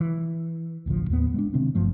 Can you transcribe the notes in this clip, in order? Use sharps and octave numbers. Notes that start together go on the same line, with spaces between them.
E3
D1 A1 D3 F3
D#2 A2 B3
G#3 A3 D4
C3 D#3 C4 D4
G1 G2 F3 A3